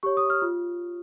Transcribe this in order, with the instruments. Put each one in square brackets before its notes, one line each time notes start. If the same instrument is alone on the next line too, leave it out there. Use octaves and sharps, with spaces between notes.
[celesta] G4 C#5 C#6
D#6
F6
F4